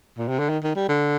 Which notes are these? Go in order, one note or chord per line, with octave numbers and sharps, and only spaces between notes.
A#2
C3
D3
D#3
D#3
G3
D3